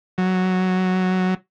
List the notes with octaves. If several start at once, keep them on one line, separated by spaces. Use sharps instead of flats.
F#3